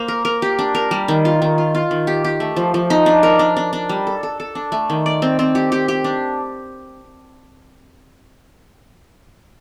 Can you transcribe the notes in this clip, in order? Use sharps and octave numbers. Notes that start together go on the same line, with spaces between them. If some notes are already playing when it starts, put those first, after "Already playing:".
Already playing: A#3 C5
A#4
A#4
G4
D4
A#4
G3
D#3
F4
D#3
F4
F4
D#3
G4
G4
A3
F3
F3
D#4
D4
A#4
D4
D4
D4
G3
A4
A4
A4
D4
A3
D#3
D5
C4
C4
G4
G4
G4
D4